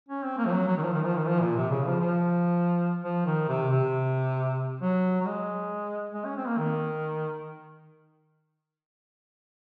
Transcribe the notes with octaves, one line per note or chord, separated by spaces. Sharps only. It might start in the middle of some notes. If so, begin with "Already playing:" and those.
C#4
C4
A#3
F3
F#3
F#3
D#3
F3
D#3
F3
D#3
F3
A#2
C3
C#3
F3
F3
F3
D#3
C3
C3
F#3
F#3
G#3
G#3
C#4
C4
A#3
D#3